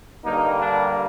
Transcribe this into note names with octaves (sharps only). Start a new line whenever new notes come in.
G2 D3 G3 A#3 D#4
D4